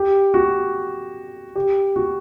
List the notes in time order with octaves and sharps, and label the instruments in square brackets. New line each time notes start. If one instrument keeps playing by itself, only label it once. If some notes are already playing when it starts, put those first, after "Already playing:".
Already playing: [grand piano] G4
F#4
G4
F#4